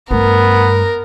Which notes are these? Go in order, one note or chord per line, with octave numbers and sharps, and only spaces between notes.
G2 A3 B3 A#4